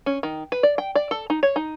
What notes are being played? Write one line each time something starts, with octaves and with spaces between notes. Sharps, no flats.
C#4
D#3
B4
D5
G5
D5
A4
D#4
C#5
D#4